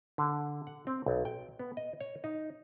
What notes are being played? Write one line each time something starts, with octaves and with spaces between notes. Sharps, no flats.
D3
F#5
C4
B1
G5
B3
D#5
C#5
D#4